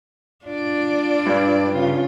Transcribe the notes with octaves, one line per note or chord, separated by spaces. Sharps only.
D4 F4 D5
G2
C#3 F4